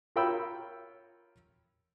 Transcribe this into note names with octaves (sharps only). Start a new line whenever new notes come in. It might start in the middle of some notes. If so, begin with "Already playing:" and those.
F4 A#4 C#5 G5 B5 E6